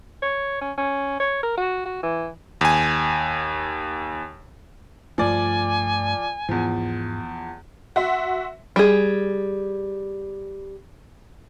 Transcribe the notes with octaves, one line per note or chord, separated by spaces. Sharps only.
C#5
C#4
C#4
C#5
A#4
F#4
F#4
E3
D#2 G#5
G2 F3 A3 D5 G#5
E2 G#2 F3
F#4 E5 C6
G3 G#4